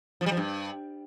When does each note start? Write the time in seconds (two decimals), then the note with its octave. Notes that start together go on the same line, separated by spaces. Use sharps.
0.21 F3
0.26 G3
0.32 F3
0.37 G2